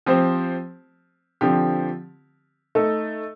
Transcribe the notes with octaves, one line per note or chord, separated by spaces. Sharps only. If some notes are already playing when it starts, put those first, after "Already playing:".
F3 C4 G4 C5
D3 F3 C4 G4
A3 D#4 A4